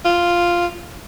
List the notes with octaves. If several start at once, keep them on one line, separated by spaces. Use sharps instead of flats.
F4